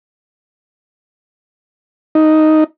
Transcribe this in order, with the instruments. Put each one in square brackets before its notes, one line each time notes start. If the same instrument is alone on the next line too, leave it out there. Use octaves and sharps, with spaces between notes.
[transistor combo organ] D#4